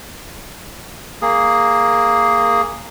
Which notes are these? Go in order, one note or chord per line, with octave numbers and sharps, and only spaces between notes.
A#3 G#4